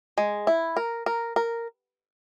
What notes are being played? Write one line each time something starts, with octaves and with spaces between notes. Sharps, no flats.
G#3
E4
A#4
A#4
A#4